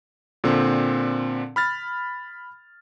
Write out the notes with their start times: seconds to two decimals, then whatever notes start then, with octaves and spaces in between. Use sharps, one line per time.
0.44 A#2 D3 C4
1.56 B5 F6 A6